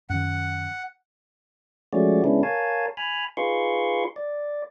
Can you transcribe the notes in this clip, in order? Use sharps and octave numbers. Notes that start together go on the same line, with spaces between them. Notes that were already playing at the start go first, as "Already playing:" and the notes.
F#2 D#3 F#5
F3 G#3 A3 C#4 F#4 D5
C#3 G#3 B3 C#4 D4 E4
A#4 C#5 F5 G#5 A5
G#5 B5 F6
D#4 F4 G#4 B4 C6 C#6
D5